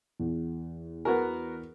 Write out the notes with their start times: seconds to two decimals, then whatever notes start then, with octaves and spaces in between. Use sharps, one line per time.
0.20 E2
1.05 B3 F#4 A#4